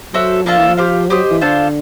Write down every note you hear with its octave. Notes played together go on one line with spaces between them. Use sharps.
F#3 F#4 A4 C5 E5
F3 A#3 D4 F4 A4
E3
F3
G4 C5 F5
F#3 G4 C5 D#5
E3
D3 D4 F4 A4 C5